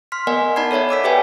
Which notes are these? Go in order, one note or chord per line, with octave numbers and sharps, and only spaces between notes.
C6 F6 B6
B3 A#4 D5 D#5 F#5 G#5
D#4 D5 A5 B5 G#6 C7
A4 C#5 D5 E5 F#5
C#5 D6 E6 B6
G4 B4 C#5 E5 G5 G#5